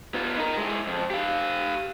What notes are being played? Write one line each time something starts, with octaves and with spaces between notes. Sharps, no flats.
B3 F4
D#4 A#4
G#3 E4
F2
G4 F5